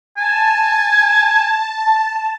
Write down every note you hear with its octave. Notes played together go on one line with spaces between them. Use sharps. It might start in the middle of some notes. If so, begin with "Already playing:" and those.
G#5 A5